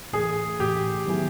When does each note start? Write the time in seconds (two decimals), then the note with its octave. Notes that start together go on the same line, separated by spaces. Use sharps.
0.13 A2 E3 A3 G#4
0.59 A2 E3 A3 G4
1.06 D#3 F#3 B3 E4 G#4